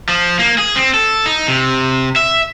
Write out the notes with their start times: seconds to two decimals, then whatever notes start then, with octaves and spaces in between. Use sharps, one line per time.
0.09 F3
0.39 A#3
0.58 G#4
0.76 C4
0.94 A4
1.26 D#4
1.48 C3
2.16 E5